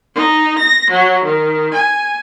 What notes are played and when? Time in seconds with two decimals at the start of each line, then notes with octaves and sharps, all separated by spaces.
0.14 D#4
0.58 A#6
0.89 F#3
1.24 D#3
1.73 G#5